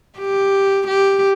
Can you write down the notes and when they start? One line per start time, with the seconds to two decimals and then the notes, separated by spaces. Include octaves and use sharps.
0.19 G4
0.88 G4